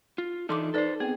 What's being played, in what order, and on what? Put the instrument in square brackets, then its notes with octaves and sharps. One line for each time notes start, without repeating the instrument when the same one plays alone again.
[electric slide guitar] F4
[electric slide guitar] E3 D4 D#4 [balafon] A4 C6 D6
[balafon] D#4 B4 D5 [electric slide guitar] A4 C5
[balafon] B3 C4 [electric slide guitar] G#4